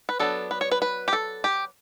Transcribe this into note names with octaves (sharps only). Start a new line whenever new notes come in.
B4
F#3 B3 D4 A4
B4
C#5
B4
B4
G4
A4
G4